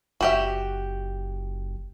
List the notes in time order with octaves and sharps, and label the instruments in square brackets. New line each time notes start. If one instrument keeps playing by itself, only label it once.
[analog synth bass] F#1 [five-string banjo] F#4 G4 E5